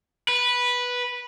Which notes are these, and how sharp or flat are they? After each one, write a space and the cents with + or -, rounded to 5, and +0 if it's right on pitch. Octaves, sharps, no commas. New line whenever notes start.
B4 -10